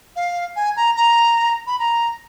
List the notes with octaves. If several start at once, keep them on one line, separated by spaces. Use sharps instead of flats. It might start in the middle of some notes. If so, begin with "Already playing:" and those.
F5
G#5
A#5
A#5
B5
A#5